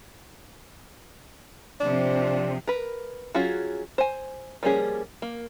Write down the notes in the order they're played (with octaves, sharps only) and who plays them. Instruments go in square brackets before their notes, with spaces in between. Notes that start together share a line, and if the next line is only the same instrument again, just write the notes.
[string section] C3 F3 [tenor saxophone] D4
[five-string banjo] A#4 B4
F#3 C#4 F4 F#4 G#4
C5 G#5
F3 G3 A#3 C#4 G#4
A#3